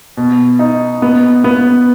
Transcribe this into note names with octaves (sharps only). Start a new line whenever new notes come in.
B2
D#4
B3
B3